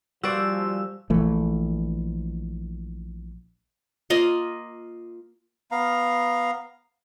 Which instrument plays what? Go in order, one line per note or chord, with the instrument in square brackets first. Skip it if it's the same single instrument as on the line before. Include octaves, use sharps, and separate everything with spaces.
[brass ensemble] A#2 F3 [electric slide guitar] G3 [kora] F#4 C5 D5 [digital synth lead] E6
[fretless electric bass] A#1 E3 A3
[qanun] A#3 F4 D#5
[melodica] B3 F5 A#5